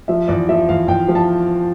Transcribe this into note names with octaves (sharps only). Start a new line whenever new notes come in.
F3 E5
E2 D5
F3 E5
E2 F5
E2 G5
F3
A5